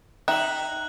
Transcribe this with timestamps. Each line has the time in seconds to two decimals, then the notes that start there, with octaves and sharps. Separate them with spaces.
0.28 D#4 E5 G5 F#6 F#7